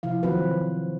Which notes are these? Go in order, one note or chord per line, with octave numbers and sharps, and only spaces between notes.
C3 F3 E4 F5
D#3 F#3 C4 F4 F#4 B4